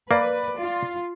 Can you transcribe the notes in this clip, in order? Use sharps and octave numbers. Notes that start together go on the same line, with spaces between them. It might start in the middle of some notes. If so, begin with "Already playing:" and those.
A#3 B4 D5
F4